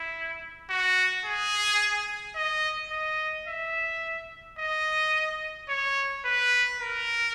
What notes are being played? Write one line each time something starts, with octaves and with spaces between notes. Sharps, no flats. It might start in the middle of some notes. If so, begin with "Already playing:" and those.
Already playing: E4
F#4
G#4
D#5
D#5
E5
D#5
C#5
B4
A#4